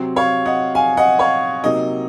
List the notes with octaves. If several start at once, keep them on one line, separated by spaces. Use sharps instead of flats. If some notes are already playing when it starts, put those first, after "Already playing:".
Already playing: C3 F#3 C4
C#5 F5
D#5 F#5
F5 G#5
D#5 F#5
C#5 F5
C3 F#3 A#3 D#4 D#5